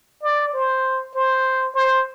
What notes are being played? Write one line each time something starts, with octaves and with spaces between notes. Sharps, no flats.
D5
C5
C5
C5